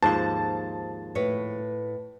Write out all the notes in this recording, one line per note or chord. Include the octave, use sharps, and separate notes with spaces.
D#2 G#2 F3 C5 A5
A2 B4 C#5